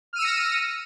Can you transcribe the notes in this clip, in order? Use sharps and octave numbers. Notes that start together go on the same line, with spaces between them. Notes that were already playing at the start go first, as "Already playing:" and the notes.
E6 F6 A#6 C#7 D#7